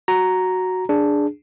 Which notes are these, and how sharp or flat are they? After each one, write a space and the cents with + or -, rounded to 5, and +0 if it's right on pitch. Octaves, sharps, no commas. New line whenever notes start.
F#4 +0 A#5 +0
D4 +0 G#4 +0